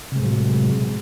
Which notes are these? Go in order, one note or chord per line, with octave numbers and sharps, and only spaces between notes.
A2 C3 F#3 G#3